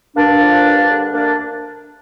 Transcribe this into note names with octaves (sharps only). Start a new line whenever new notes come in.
G2 A#3 D4
D3 F3
G2
D3 G3
D2 A#3 D4